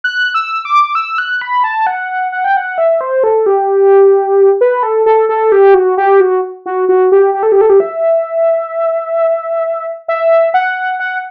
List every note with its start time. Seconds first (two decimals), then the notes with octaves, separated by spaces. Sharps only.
0.04 F#6
0.34 E6
0.65 D6
0.95 E6
1.18 F#6
1.41 B5
1.64 A5
1.87 F#5
2.32 F#5
2.44 G5
2.57 F#5
2.78 E5
3.01 C5
3.24 A4
3.46 G4
4.61 B4
4.83 A4
5.06 A4
5.29 A4
5.52 G4
5.74 F#4
5.97 G4
6.20 F#4
6.66 F#4
6.89 F#4
7.12 G4
7.34 G4
7.43 A4
7.52 G4
7.61 A4
7.70 G4
7.80 E5
10.08 E5
10.54 F#5
11.00 F#5